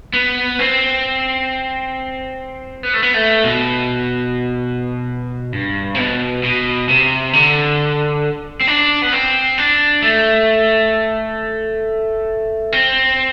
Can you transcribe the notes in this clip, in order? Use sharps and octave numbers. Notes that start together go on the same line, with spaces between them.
B3
C4
B3
A3
B3
A3
B2
G2
C3
B2
B2
C3
D3
C4
D4
B3
C4
D4
A3
C4